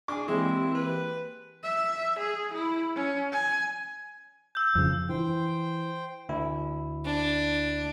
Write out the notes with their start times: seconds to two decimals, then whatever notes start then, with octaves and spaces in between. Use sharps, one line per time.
0.08 D4 G#4 D6
0.28 E3 G#3 A#3 C4 E4 G4
0.75 B4
1.64 E5
2.19 G#4
2.54 E4
2.95 C#4
3.32 G#5
4.55 E6 G6
4.75 F2 C#3
5.09 E3 C5 G5
6.29 D2 E4
7.06 D4